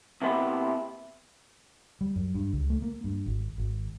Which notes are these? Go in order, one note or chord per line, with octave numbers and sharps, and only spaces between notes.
C3 A#3 B3 E4 G4
G3
F#2
G2
C#2
A3
A#3
G2
G#1
G#1